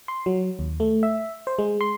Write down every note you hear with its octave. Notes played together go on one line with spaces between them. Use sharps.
C6
F#3
D#2
A3
E5
C5
G#3
C6